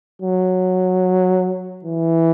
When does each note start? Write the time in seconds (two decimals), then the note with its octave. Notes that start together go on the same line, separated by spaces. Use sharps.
0.22 F#3
1.84 E3